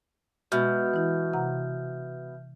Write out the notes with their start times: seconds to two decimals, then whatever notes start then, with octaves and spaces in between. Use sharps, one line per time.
0.52 B2 G#3 E5 F6 G6
0.94 E3 E4
1.33 C3 F#5 A#5